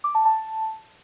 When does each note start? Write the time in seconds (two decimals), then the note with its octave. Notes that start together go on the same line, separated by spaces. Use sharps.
0.04 D6
0.15 A5
0.25 A5